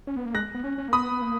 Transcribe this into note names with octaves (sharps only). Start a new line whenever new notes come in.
C#4
B3
A#3
G#3 F#6 A#6
B3
C#4
C#4
A#3
B3 B5 D#6
B3
A#3